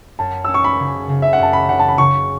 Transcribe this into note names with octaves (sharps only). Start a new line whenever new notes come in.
F#2 A5
C#4 E6
C#6
B5
C#3
C#3
E5
F#5
F#2 A5
B5
C#3 F#5
A5
B5
C#3 C#6